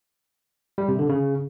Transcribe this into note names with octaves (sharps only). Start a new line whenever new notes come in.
G3
C3
D3
C#3